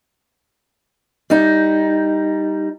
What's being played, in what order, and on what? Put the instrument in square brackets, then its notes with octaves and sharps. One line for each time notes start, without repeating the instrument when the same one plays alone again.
[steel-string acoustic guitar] G3 D#4